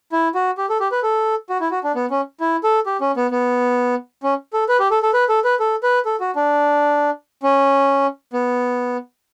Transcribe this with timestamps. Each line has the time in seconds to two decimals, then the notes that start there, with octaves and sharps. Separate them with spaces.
0.12 E4
0.35 F#4
0.58 G4
0.69 A4
0.80 G4
0.92 B4
1.03 A4
1.50 F#4
1.60 E4
1.71 F#4
1.84 D4
1.95 B3
2.10 C#4
2.40 E4
2.64 A4
2.86 G4
3.01 C#4
3.17 B3
3.31 B3
4.23 C#4
4.53 A4
4.69 B4
4.80 G4
4.91 A4
5.03 A4
5.14 B4
5.29 A4
5.44 B4
5.59 A4
5.83 B4
6.05 A4
6.20 F#4
6.36 D4
7.43 C#4
8.33 B3